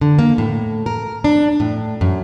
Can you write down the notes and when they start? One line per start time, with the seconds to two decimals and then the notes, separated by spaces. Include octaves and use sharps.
0.01 D3
0.19 A#3
0.38 A2
0.86 A#4
1.24 D4
1.60 A2
2.01 F#2